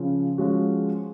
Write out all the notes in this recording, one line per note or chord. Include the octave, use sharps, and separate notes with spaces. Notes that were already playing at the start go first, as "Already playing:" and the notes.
Already playing: C#3 F3
F3 G#3 C#4 F#4